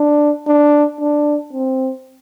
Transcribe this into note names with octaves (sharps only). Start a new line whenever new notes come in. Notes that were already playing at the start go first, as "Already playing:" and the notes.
Already playing: D4
D4
D4
C4